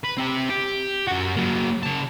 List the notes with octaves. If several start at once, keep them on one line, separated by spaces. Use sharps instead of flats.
B4
C4 G4
G4
F#2 F#4
F#3 A#3
C#3 A5